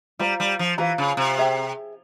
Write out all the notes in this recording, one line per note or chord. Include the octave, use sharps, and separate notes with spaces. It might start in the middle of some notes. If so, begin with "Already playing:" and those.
G3 F4 C5 F5 A#5
G3
F3
E3 F4 C5 F5 A#5
C#3
C3
G#4 E5 G5